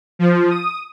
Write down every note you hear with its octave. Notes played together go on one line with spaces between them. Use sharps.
F3
D#6